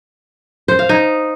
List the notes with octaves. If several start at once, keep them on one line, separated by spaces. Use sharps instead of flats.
C5
F5
D#4